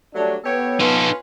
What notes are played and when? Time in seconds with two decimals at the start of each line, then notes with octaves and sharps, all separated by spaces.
0.13 F#3 G3 A3 D4
0.44 B3 G4 A4 C#5
0.80 C#4 D#4 F4 A4 B4